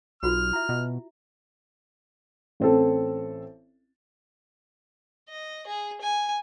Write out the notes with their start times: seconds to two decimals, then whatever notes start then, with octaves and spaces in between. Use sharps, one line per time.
0.23 B1 F4 F#4 A#4 F6
0.53 E4 E5
0.69 B2
2.60 A1 C4 A4
5.29 D#5
5.66 G#4
6.01 G#5